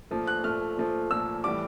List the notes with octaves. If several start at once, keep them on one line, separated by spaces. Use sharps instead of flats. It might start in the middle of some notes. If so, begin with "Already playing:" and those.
A#2 F3 A3
F#6
A#2 F3 A3 F6
A#2 F3 A3
A#2 F3 A3 E6
A2 E3 G3 D6